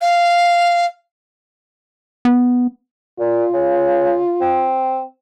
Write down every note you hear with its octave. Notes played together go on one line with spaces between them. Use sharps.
F5
B3
A#2 F4
C#3
C4